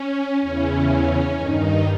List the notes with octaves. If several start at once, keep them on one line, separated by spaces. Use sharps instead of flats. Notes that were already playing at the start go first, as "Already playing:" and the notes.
Already playing: C#4
E2 C#3 E3 C#4
G2 D#3 D#4